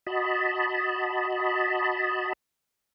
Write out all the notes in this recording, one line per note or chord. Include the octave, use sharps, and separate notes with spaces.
F#4 D#5 A5 B5